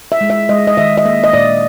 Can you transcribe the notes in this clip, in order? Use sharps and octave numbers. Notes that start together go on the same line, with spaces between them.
E5
G#3
E5
G#3 D#5
D#5
D#3 E5
D#5
A#3 E5
D#5
A#2 D5